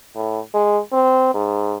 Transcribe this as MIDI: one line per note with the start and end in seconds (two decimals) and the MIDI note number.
0.16 0.39 45
0.54 0.79 56
0.93 1.29 60
1.34 1.77 44